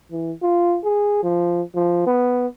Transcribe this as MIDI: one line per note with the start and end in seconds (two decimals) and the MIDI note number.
0.12 0.32 52
0.42 0.78 65
0.84 1.20 68
1.23 1.62 53
1.75 2.03 53
2.07 2.47 59